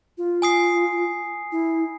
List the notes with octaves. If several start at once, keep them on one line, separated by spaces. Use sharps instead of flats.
F4
G#5 D#6 C7
E4